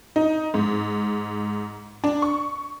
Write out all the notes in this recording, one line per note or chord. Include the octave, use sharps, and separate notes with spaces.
D#4
G#2
D4
C#6